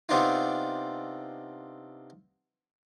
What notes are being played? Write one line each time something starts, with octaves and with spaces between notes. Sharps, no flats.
C3 B3 C4 D4 D#4 F4